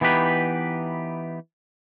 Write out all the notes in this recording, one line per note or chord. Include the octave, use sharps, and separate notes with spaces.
E3 B3 D#4 G4 B4